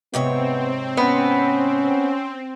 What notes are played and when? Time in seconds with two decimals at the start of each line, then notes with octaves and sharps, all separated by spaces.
0.14 G#2 C3 B3 C4 C#5
0.97 B3 C#4